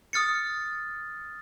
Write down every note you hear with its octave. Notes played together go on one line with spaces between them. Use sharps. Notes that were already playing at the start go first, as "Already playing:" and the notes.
D#6 F6 A6 C#7